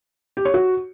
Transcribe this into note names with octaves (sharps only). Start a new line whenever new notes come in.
G4
C#5
F#4